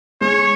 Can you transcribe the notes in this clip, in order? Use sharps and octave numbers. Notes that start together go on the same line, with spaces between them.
G#3 G#4 C#5